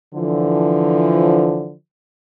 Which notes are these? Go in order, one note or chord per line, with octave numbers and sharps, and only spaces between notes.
D3 E3 F3